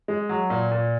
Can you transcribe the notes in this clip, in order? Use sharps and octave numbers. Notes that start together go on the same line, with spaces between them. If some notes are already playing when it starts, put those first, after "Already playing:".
G#3
F#3
A#2
A#2